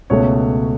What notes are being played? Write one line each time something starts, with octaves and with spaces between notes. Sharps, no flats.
C#2 B2 A3 C#5